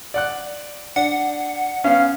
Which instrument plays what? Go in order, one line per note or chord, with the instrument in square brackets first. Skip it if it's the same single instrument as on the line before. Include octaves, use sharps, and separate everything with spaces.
[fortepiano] D5 F#5 F#6
[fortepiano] D4 [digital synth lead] F#5
[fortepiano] B3 C#4 [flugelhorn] F5